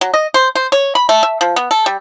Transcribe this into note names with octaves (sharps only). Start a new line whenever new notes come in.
F#3
D#5
C5
C5
C#5
B5
A3
E5
F3
B3
A4
G3